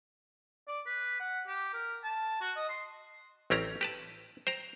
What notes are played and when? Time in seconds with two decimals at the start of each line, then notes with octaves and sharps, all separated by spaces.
0.68 D5
0.86 B4
1.20 F#5
1.47 G4
1.74 A#4
2.04 A5
2.41 F#4
2.56 D#5
2.69 C6
3.50 A1 C4 C#4 G4 A#5
3.81 G4 B4 A5
4.47 C5 G5 A#5